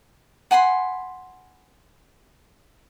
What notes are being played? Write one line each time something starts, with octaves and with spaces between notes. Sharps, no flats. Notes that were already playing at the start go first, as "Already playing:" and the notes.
F#5 G#5 B5 C6